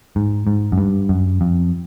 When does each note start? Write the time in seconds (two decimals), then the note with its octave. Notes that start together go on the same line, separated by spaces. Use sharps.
0.16 G#2
0.47 G#2
0.72 F#2
0.78 G2
1.09 F#2
1.41 F2